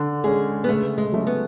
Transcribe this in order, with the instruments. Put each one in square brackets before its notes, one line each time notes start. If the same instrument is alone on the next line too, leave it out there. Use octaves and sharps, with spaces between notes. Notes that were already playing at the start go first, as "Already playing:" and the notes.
Already playing: [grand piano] D3
[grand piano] G#3 C#4 [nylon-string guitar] G#4
[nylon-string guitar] B3
[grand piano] C#3 [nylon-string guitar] A3
[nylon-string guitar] G#3
[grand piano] F#3 A3 C#4
[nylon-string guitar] B3